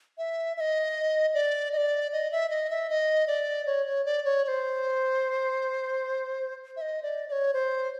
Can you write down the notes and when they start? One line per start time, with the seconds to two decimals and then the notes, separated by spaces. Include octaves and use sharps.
0.18 E5
0.57 E5
0.60 D#5
1.34 D5
1.73 D#5
1.77 D5
2.12 D#5
2.32 E5
2.50 D#5
2.70 E5
2.90 D#5
3.27 D5
3.66 C#5
3.86 C#5
4.05 D5
4.25 C#5
4.45 C#5
4.48 C5
6.77 E5
6.81 D#5
7.03 D5
7.28 D5
7.32 C#5
7.54 C5